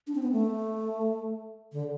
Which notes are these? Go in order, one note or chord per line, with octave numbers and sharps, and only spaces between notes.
D4
C4
B3
A3
D3